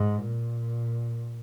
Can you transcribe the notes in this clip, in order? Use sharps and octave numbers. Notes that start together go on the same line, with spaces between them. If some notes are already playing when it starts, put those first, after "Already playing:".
Already playing: G#2
A#2